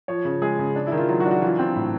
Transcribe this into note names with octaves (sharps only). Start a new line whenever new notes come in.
F3 C#5
C#3
G#3 G#4
C#3
D4
E4
D#3
F4
F#3 F4
F#4
D4
F#4
E3 F4
C4
A2